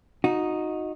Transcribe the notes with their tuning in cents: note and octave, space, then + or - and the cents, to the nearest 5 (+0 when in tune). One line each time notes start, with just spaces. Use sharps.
D#4 +0 F#4 -25